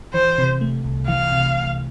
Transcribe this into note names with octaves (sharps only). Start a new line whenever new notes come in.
E3 C5
C3
A3
C2
E3 F5
C3